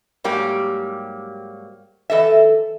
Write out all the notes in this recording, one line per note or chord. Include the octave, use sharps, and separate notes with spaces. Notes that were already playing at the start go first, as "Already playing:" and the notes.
G#2 F#3 G3 A#3 G4
E3 A4 D#5 E5